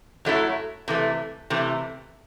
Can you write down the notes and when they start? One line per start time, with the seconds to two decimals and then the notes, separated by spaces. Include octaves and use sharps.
0.25 F#2 F#3 A3 E4
0.88 C3 E3 A3
1.50 C3 E3 A3